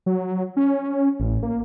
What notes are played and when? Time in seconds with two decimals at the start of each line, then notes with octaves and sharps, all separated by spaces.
0.06 F#3
0.57 C#4
1.20 A1
1.43 A#3